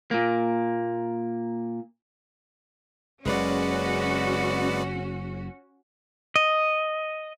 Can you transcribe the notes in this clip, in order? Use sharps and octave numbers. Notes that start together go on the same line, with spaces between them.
A#2 A#3
F#1 C#3 G#3 C#4 F#4 B4 D5
D#5